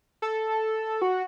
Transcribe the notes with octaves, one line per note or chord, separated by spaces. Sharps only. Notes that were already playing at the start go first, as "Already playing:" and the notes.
A4
F#4